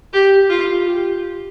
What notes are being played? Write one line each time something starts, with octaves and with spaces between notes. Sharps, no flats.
G4
F4
G4